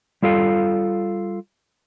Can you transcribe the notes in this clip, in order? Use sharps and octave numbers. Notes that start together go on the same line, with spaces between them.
G3 F4 A4 F5